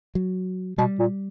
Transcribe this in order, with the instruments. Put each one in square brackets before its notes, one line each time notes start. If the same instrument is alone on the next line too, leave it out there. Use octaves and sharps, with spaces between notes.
[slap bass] F#3
[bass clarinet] B2 [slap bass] G3
[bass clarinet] A#2